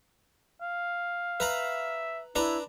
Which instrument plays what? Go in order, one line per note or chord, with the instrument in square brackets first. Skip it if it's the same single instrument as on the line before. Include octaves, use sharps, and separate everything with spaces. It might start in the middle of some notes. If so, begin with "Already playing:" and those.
[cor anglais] F5
[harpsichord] B4 A#5 B5 [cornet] E5
[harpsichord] D4 B4 A#5 [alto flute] E4